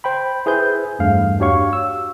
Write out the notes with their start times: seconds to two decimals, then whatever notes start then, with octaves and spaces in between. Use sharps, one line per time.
0.04 C5 G5 B5
0.46 E4 G#4 B4 C5 G6
0.99 E2 G2 A3 F5
1.40 D4 F#4 G4 C#5 F5 C#6
1.73 E6